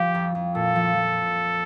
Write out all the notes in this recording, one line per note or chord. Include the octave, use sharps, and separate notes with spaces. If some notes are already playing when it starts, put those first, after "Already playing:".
Already playing: F3 G4
F2
F2
A#2 A4
F3
F3